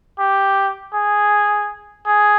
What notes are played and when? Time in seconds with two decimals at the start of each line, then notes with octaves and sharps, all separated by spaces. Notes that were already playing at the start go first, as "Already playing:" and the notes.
0.19 G4
0.93 G#4
2.05 G#4